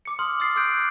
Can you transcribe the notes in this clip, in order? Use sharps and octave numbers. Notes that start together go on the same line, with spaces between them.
D6 C#7
C6 D#6 F6 F#7
D#6 F6 A6 C7
D6 E6 F#6 G6 D7
D7